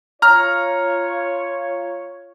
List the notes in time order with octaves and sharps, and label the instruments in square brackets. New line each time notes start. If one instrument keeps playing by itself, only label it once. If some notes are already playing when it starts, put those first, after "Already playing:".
[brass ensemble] F4 C#5 [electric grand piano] A#5 F6